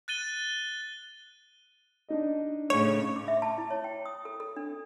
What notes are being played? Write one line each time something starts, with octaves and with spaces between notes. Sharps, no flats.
F#6 A6 D#7 G7
D4 D#4 D#5
A2 C#3 C#5
D6
E5
A5
E4
C#5
G5
D#6
A4
A4
D4